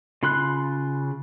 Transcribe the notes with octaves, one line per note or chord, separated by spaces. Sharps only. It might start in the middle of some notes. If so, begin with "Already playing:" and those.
C#3 F4 B5 C6 F#6